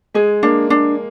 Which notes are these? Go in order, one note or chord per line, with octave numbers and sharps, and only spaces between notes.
G#3 G#4
A#3 D4
D4